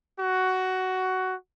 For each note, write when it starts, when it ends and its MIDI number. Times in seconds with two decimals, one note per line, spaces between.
0.19 1.36 66